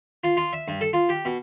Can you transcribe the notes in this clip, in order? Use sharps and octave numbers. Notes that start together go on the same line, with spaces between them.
F4
F4
E5
G2
A4
F4
G4
B2